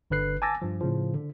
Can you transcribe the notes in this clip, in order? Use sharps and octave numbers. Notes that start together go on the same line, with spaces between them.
G1 D3 B4 F#6 C7
G#5 A5 D6 E6 A6 A#6
G2 F3
A2 C#3 F3
D3